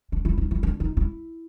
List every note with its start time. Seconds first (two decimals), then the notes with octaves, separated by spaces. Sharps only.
0.12 D4
0.25 E4
0.38 D#4
0.51 E4
0.63 D4
0.80 D#4
0.97 E4